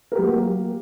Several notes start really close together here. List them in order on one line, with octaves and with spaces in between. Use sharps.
A#4 G4 F#3 A#3